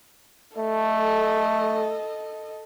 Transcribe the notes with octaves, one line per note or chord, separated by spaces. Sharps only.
A3 A4 D#5